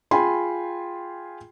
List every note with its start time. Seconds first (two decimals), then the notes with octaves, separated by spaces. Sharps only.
0.11 F4 G#4 G5 G#5 B5 C6